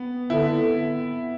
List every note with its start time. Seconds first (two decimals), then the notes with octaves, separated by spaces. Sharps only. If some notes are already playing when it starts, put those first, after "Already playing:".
Already playing: B3
0.30 D3 E4